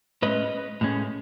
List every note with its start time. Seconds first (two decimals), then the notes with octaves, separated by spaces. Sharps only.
0.22 A2 G#3 C#4 B4 D#5
0.81 A2 G#3 C#4